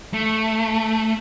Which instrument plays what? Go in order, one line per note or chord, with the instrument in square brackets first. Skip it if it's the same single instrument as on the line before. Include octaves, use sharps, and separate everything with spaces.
[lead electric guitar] A3